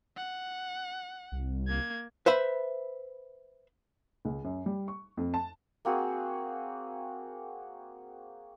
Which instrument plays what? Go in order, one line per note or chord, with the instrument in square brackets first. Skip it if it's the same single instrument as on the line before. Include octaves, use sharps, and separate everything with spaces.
[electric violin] F#5
[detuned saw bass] C2
[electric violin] A#3 G#6
[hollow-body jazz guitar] B4 C5 E5 B5
[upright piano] C#2
F#2
G3
C#6
F2
A5
[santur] A#3 C4 F#4 G#4